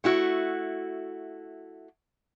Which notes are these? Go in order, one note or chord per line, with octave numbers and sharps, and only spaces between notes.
A3 E4 F#4